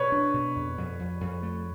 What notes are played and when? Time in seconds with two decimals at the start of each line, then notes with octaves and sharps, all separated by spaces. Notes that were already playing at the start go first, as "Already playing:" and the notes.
Already playing: B2 B4 C#5
0.12 D4
0.34 B2
0.56 F2
0.78 F2
0.99 F2
1.21 F2
1.42 A3